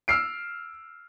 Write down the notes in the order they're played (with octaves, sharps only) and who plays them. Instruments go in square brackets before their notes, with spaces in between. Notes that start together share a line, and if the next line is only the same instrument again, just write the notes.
[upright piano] E6 F6 C7 D7